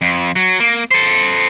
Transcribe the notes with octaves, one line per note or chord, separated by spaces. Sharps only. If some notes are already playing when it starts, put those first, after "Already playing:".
F2
F#3
A#3
A4 C5